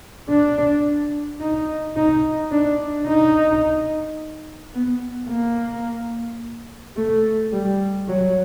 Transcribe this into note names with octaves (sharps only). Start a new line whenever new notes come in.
D4
D#4
D#4
D4
D#4
B3
A#3
A3
G3
F#3